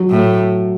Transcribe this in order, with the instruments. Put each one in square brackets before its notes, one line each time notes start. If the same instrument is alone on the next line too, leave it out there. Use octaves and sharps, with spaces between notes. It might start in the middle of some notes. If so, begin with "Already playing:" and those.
Already playing: [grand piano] F#3
[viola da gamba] A2